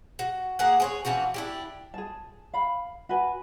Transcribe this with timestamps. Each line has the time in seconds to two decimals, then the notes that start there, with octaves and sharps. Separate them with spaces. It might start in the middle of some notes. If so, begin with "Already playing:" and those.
0.19 F#4
0.59 A#3 G#4 F#5
0.80 G#4 C5 C#5
1.05 E3 F3 C#4 F#4
1.34 D4 E4 G4
1.94 G#4 A5
2.54 F5 B5
3.09 F#4 B4 G#5